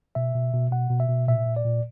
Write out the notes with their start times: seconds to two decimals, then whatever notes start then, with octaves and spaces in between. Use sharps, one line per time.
0.15 B2 E5
0.35 B2
0.54 B2
0.71 B2 F#5
0.90 B2
1.00 E5
1.08 B2
1.28 A#2 E5
1.46 A#2
1.56 D5
1.65 A#2